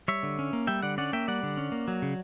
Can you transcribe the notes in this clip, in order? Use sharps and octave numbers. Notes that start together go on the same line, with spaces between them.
G3 C#5 E5
D3
C#4
A#3
G3 E5 G5
D3 D5 F#5
C#4 D5 F#5
A#3 E5 G5
G3 D5 F#5
D3
C#4
A#3
F#3
C#3